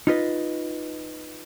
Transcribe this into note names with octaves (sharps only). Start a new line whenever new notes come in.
D#4 F4 B4 D#5